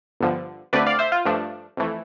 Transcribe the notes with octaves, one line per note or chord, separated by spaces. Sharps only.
G1 G2 D3 F3
D2 D3 A3 C4 B4 D5
D5 F5
C5 E5
F4
G2 F3 A3 D4
F2 E3 A3